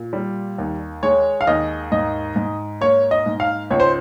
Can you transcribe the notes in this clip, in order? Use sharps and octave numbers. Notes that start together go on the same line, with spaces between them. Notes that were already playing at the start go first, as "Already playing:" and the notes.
Already playing: A#2
G3
D#2
G#3 C#5
F5
D#2 D#5
G#2 D#5
G#2
A#3 C#5
D#5
G#2
F5
C#2 C#5
C5